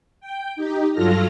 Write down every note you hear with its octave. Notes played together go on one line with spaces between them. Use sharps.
G5
D#4 G4
G2 F#3 F4 A4 F6 A#6